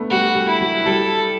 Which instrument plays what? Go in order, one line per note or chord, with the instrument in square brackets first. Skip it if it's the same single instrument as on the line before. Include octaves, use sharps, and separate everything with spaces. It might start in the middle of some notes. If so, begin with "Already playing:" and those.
Already playing: [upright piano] A3 B3 D4
[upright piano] G3 [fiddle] F#4
[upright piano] G3
[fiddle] E4
[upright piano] F#3
[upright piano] G3 [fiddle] A4